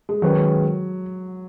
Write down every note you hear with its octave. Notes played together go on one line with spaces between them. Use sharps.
G#3
D#3 F#3 G#3 C#4 G#4 B4